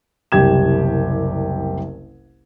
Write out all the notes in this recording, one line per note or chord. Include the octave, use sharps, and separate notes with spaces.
F#1 C2 G4 G#6 E7